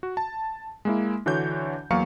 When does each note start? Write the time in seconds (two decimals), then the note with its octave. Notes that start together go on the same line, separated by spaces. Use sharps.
0.03 F#4
0.17 A5
0.85 G#3 A#3 E4
1.26 D3 E3 D4 F#4 C#5 G6
1.90 E2 F#3 A#3 F5 C#6 C#7